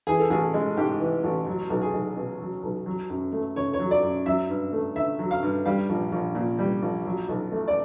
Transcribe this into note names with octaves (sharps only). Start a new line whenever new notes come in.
E3 G#4
A4
A1 G#4
G#3
G#2 G4
E3
A1
F#3
B1
G#4
B1
B2
F#3
B1
F#3
F#2
A3
C#3 C#5
C#5
F#3
D5
F#2
F#3 E5
G2
A3
D3 E5
F#3
F5
G2
G3 F5
A#1
A#1
A#2
G3
A#1
F#3
B1
A3
D5